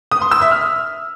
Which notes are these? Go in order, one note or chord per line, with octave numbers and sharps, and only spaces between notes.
D#6
C6
E6
E5
F6